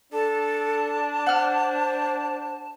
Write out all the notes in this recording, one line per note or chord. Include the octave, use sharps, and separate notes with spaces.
D4 A4 A5
C5 F#5 F6